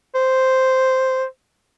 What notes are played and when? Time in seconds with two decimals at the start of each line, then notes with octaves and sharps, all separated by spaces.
0.15 C5